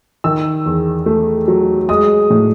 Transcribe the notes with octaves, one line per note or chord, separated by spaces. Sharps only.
D#3 E6
E2
A3
F#3
G#3 D#6
A2